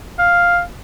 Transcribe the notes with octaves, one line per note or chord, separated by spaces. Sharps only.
F5